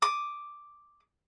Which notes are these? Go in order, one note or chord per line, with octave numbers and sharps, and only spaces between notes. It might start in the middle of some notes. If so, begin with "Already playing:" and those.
D6 D#6